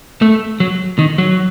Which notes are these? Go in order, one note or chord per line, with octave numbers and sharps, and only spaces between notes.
A3
F#3
D#3
F#3